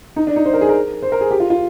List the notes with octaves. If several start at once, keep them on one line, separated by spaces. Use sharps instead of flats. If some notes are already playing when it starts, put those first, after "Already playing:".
D#4
D4
D#4
C5
A#4
G#4
A#4
C5
A#4
G#4
G4
F4
F4